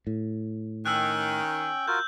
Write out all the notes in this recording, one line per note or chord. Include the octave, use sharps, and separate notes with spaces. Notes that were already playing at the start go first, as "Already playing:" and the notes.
A2
D#3 C#4 G5 E6 F#6
F4 F#4 A#4 G6